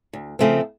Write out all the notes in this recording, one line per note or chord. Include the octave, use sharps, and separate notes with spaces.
D2
C#3 F3 A3 C4